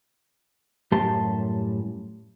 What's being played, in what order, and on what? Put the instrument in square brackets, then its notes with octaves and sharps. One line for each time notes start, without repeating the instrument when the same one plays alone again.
[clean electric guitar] F#2 A2 G3 G4 A5 C6